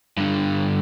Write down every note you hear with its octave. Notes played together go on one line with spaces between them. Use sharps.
G2 D3